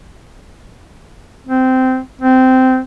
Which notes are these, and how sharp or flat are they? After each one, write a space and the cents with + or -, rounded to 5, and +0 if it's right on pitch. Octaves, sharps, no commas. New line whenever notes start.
C4 -15
C4 -15